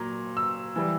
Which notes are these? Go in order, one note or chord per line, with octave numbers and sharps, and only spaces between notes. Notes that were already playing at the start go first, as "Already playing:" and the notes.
Already playing: A#2 F#3 A#5
E6
E3 G3